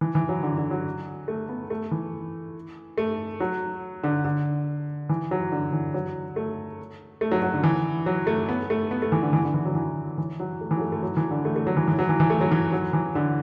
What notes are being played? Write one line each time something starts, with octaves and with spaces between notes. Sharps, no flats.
E3
E3
F#3
D3
D3
F#3
A3
B3
A3
E3
A3
F#3
D3
D3
E3
F#3
D3
E3
F#3
A3
A3
F#3
F#3
D3
E3
F#3
A3
B3
A3
B3
A3
E3
D3
E3
D3
E3
F#3
E3
E3
F#3
A3
E3
F#3
A3
A3
F#3
E3
D3
A3
A3
F#3
E3
E3
F#3
E3
E3
A3
F#3
E3
F#3
E3
D3